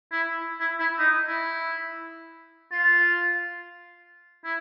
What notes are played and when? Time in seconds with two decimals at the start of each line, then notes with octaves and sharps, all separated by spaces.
0.12 E4
0.60 E4
0.80 E4
0.99 D#4
1.28 E4
2.72 F4
4.45 E4